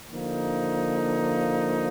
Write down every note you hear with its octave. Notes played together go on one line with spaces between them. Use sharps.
D3 F3 A#3 D#4